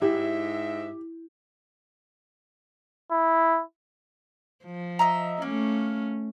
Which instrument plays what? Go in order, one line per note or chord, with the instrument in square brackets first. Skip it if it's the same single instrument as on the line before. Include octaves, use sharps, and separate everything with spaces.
[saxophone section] G#2 E5 [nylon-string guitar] E4 [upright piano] G4
[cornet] E4
[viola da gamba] F3
[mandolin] D#5 E5 A#5
[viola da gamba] A3 C#4 [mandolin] A#3